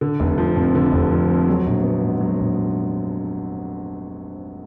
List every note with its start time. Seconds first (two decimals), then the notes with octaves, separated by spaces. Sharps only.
0.01 D3
0.20 F1
0.38 F3
0.56 F2
0.75 D3
0.92 F1
1.12 F3
1.30 F2
1.48 F#3
1.66 A#1
1.83 B3
2.02 G#2
2.21 F#3
2.39 A#1